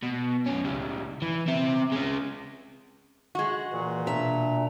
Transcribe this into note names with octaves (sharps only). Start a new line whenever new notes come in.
B2
B1 C#4
C#2 G3
E3
C4 E5
G#3 C#4
G#3 F#4
A#2 E3
B2 D4 E5 A#5